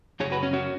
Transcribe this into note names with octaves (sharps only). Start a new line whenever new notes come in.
F#2 C#3 F#3 G#4 C#5
F#4 B4
C#4
C#4 F#4